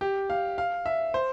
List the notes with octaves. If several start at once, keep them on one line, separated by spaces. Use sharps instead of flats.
G4
F5
F5
E5
C5